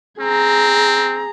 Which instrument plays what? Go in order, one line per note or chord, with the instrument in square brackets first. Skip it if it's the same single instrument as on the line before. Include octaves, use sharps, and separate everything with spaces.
[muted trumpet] C4 [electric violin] G#4 A#5